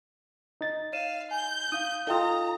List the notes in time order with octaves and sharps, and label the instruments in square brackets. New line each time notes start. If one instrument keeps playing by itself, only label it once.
[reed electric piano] D#4 A6
[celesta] C#5 D#7 E7 [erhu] F5
[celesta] G#5 [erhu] G6
[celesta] D#4 F5 D#7 [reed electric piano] D#6
[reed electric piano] D#4 F4 [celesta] A4 G5 D#6 [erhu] A#5